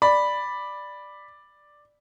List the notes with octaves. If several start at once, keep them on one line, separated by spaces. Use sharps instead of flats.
D5 B5